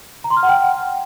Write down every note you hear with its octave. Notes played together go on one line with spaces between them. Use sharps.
A#5
C6
F6
F#5
G5